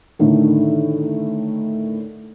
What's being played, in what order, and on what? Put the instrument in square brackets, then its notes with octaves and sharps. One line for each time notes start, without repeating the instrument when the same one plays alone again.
[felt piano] A2 D3 D#3